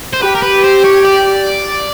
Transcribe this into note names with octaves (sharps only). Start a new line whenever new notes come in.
C5
G4 B4
A#4
B4
C5
C#5
D5